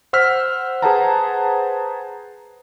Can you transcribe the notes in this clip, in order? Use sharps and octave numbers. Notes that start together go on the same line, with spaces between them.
C5 F#5 E6 F6 B6
G#4 B4 C5 F#5 A5 A#5